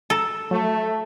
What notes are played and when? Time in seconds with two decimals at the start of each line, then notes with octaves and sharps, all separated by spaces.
0.10 A4 A5 A#5
0.51 F#3 A3